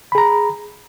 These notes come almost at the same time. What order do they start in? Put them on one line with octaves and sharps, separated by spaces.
B5 G#4 A#5